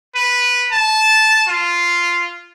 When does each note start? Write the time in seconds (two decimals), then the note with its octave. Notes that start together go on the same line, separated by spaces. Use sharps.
0.15 B4
0.72 A5
1.48 F4